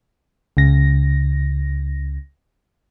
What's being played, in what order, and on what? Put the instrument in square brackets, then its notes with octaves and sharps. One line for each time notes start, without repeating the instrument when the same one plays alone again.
[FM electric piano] C#2 C#3 A#6